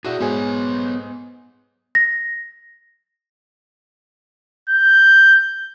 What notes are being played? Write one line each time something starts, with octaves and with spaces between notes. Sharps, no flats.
D4 E4 F#4 G#4
G#2 B3 G#4 C#5
A#6
G6